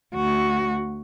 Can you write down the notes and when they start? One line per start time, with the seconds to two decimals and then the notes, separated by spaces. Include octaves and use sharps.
0.14 D2 F#4